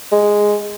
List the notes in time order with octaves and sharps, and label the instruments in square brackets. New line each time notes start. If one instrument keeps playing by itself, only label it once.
[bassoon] G#3